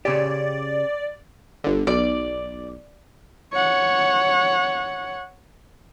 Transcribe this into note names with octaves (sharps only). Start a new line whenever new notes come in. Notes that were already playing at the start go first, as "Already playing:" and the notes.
C#3 C#4 G4 D5
G1 D3
B1 D5
C#5 F#5